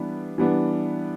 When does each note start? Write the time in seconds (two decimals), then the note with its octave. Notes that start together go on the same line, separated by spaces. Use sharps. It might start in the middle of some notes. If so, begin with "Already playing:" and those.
Already playing: E3 G3 B3 D4
0.38 E3 G3 B3 D4